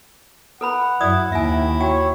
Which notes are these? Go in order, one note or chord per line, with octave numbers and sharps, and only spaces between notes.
A4 B4 F#5 B5
F#2 E4 D5 D#6
D#2 D#3 E4 E5 G#5
F#4 C#5 G5